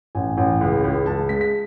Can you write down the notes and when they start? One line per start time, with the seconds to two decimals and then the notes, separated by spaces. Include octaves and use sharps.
0.15 A1 G#5
0.37 A1
0.61 C#2
0.84 C#2
1.06 C#2 A5
1.29 G#3 B6
1.41 B6